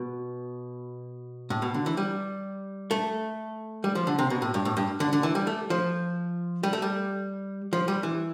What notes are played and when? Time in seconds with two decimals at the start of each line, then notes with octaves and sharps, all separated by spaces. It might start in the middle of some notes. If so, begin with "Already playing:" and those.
Already playing: B2
1.50 A2
1.62 B2
1.74 D3
1.86 E3
1.97 G3
2.91 A3
3.84 G3
3.95 F3
4.07 D3
4.19 C3
4.30 B2
4.42 A2
4.54 G2
4.65 A2
4.77 G2
5.00 D3
5.13 D3
5.23 E3
5.35 G3
5.47 A3
5.70 F3
6.63 G3
6.73 A3
6.82 G3
7.73 F3
7.88 G3
8.03 E3